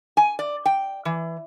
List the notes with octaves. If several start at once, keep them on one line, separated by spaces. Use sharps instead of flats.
G#5
D5
G5
E3